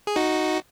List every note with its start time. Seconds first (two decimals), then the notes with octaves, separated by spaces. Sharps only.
0.07 G#4
0.16 D#4 F#4